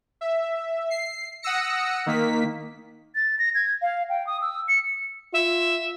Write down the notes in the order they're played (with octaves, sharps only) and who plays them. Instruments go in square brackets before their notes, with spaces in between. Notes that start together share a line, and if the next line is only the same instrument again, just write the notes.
[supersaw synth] E5
C7
F#5 D#6 E6 A#6 C#7
D#3 A#3 B6
[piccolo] A6
A#6
G#6
F5
G5
D#6
E6
C#7
[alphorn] F4 [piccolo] E5